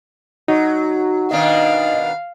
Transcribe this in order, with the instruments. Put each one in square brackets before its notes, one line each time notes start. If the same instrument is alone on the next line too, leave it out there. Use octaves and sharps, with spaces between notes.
[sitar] F#3 [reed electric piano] D#4 [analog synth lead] F#4
[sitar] B2 D#3 D4 [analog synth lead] D#5 [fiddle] F5